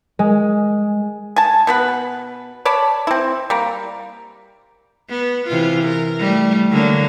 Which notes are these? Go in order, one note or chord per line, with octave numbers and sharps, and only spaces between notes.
G#3
G#5 A5
B2 B3 B4
C#5 D5 A5 B5
C4 E4
G3 A#3
B3
C3 E3 F4
A#4
G3 A3
D3 F#3 A#3